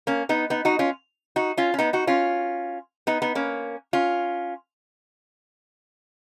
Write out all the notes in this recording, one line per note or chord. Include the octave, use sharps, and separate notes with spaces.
A#3 C#4
B3 D#4
B3 D#4
D#4 F#4
C#4 F4
D#4 F#4
C#4 F4
C#4
B3 D#4
D#4 F#4
C#4 F4
B3 D#4
B3 D#4
A#3 C#4
C#4 F4